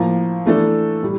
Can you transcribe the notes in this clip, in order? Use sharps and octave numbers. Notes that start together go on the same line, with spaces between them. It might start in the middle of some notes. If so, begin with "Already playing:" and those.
Already playing: A2 F3 A#3
E3 A3 D4 A4
A2 G3